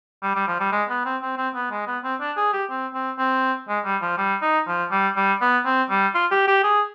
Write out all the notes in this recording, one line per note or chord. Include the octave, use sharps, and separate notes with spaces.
G3
G3
F3
G3
G#3
B3
C4
C4
C4
B3
G#3
B3
C4
D4
G#4
G4
C4
C4
C4
G#3
G3
F3
G3
D#4
F3
G3
G3
B3
C4
G3
F4
G4
G4
G#4